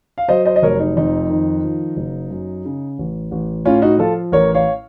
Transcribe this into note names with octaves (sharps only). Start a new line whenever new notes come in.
F5
F#3 C5 D#5
C5 D#5
D#5
F1 A#4 C#5
D#4
F2 D#4
D#3
F3
F#1
F#2
C#3
A1
A1
A2 C#4 F4
D#4 F#4
F3 F4 A4
A1 A#4 C#5
C#5 F5